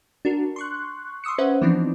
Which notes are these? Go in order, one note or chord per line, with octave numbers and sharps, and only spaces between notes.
D4 F#4 A#4
C6 C#6 F#6
C6 C#6 D#6 E6 C#7
C#4 B4 C5 E5 F#5
E3 F3 B3 C4 D4 D#4